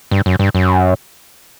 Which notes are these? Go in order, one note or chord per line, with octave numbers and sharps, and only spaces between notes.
G2
F#2
G2
F#2